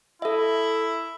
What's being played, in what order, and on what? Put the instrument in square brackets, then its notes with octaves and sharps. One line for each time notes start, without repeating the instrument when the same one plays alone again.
[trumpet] E4 [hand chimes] A4 E5